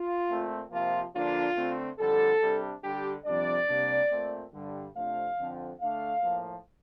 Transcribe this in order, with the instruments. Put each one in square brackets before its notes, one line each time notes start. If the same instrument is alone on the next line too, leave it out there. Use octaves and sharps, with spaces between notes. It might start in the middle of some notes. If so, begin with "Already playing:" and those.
Already playing: [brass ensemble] F4
A#2 A3 C4
C3 F3 A#3 F4
D3 F3 A#3 D4 F4
D3 A3 C4
F2 D3 G3 A4
C3 G3 D4
D3 G3 D4 G4
F2 C3 G3 D4 D5
C3 G3 A#3 D4
A#2 A3 C4
G2 D3 G3
F2 C3 F3 A3 D4 F5
F2 D3 F3 C4
D3 A3 D4 F5
A2 F3 A#3